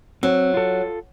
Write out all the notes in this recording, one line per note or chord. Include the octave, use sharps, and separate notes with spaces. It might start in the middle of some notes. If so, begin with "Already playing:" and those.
F#3 C4
F4 A4